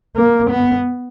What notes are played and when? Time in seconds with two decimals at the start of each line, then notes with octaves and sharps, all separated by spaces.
0.16 A#3
0.50 B3